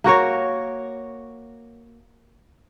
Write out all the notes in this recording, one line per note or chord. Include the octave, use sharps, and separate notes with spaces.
A#3 F#4 A#4 C#5